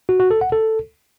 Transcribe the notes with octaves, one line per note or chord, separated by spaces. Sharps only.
F#4
F#4
A4
F#5
A4